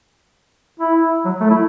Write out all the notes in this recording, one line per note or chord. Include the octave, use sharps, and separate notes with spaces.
E4
F#3
A3
E4